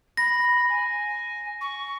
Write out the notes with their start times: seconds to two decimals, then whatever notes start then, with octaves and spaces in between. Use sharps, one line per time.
0.17 B5 A#6
0.69 G#5
1.61 C#6